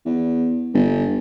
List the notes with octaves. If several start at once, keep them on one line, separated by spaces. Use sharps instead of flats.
E2
G1